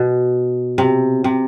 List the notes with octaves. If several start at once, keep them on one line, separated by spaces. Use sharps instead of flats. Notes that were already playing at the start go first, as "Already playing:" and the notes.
Already playing: B2
C3
C3